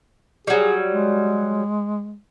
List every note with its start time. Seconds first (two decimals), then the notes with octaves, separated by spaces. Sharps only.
0.47 F#3 G3 G#4
0.91 G#3